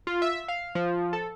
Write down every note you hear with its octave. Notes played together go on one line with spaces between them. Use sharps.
F4
E5
F5
F3
A4